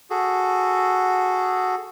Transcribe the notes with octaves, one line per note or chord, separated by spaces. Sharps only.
F#4 G#4 A4